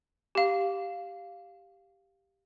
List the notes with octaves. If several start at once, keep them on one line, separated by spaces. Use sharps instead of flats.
G4 F5